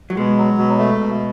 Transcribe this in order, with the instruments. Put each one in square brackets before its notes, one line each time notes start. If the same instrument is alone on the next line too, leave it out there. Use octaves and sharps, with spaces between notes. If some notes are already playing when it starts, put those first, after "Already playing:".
[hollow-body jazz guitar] F#3
[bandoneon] B2 [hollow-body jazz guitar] G#3
[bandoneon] F#3
B2
A3
B2